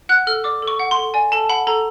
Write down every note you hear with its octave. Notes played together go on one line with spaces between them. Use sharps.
F#5 F#6
A4 F6
D5 D6
A4
C#6
F#5
C6
A4
D5 G#5
A4 A5
F#5 B5
A4 A#5